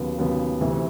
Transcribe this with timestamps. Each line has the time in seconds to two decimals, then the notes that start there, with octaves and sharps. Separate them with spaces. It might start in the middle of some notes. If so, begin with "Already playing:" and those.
Already playing: D#2 C#3 F#3 B3
0.18 D#2 C#3 F#3 B3
0.61 D2 C3 E3